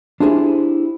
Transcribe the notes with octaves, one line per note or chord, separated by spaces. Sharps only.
D4 E4 F4 G4 G#4 C5